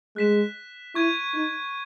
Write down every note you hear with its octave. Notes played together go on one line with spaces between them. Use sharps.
G#3 F#6 B6 E7
E4 C#6 G#6 D#7
D#4